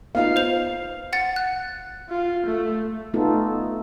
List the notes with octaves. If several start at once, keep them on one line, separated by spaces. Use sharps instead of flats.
B3 D#4 F4 F5
C5 C7 F7
F#5 A6
F#6
F4
A3
A3 B3 D#4 F4 A4